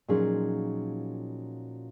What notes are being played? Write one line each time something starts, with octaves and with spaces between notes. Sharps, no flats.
A#2 F3 F#3 C#4 D#4 G#4